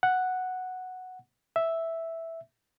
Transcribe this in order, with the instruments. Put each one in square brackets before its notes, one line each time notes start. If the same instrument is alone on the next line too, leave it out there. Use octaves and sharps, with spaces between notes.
[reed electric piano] F#5
E5